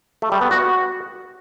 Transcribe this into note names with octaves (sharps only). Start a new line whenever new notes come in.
A3
G3
B3
F#4